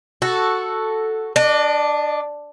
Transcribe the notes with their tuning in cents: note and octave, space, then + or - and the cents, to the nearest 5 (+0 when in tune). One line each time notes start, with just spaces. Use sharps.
F#4 +0 A4 +0
D4 +0 D#5 -40